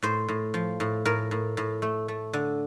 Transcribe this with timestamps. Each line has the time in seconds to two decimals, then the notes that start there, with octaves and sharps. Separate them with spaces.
0.02 A2 C5
0.29 A2
0.54 F3
0.80 A2
1.05 A2 A#4
1.31 A2
1.57 A2
1.82 A3
2.08 A3
2.33 D3